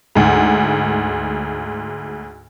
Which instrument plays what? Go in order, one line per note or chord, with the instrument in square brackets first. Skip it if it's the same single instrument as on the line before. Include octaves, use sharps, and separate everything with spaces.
[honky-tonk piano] D2 G#2